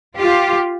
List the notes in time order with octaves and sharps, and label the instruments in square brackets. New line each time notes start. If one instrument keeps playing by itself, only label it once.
[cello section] F4 G4